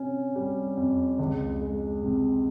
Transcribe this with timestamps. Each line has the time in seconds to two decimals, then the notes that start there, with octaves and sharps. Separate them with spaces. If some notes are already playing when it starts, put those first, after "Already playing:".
Already playing: C3 C#4
0.36 G3
0.77 F2
1.19 C#2
1.61 G#3
2.03 C3